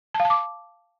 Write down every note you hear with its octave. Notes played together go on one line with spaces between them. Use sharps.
A5
F5
A5
D6